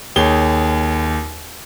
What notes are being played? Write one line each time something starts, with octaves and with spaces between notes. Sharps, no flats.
D#2 G#4 C#5 G7